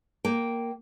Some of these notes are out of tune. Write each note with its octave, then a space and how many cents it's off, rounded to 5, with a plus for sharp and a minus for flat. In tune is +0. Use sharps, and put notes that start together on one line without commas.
A#3 +0 G5 -5